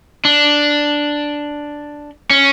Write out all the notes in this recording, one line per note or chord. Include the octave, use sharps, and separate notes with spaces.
D4
C#4